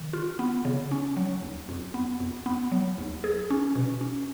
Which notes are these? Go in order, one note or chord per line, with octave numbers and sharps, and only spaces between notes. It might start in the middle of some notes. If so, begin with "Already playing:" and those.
Already playing: D#3
F4
B3
C#3
C#4
F#3
D#2
F2
B3
F2
B3
F#3
D#2
G#4
C#4
B2
C#4